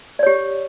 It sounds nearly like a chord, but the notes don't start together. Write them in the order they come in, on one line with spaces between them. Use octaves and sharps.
D5 C#5 G4